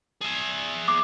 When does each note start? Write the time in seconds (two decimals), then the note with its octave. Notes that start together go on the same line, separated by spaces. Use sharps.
0.22 G#4 E5
0.88 D6